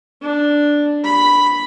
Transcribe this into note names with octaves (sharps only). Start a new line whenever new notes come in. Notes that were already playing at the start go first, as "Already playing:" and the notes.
D4
B5